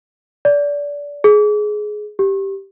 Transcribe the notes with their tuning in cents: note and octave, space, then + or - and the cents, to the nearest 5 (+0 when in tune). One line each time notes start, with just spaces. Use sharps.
D5 -25
G#4 +15
G4 -5